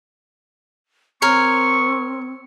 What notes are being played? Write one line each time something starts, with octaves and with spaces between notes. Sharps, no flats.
C4 A#4 C#5 C#6